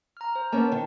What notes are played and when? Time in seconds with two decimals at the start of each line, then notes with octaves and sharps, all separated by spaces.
0.17 A#5 F6
0.35 C5
0.52 A#3 B3 C#4 A5
0.72 D#3